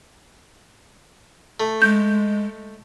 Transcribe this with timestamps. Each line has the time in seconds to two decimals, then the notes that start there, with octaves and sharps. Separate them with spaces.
1.60 A3
1.82 G#3 G6